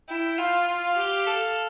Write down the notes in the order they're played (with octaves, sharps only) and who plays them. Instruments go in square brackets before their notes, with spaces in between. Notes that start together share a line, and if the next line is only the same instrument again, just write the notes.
[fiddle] E4 [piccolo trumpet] G5
[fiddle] F4 [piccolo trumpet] F5
[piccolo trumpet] F5
[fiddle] G4
A4